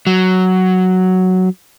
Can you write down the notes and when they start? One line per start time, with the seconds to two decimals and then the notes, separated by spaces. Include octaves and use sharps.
0.07 F#3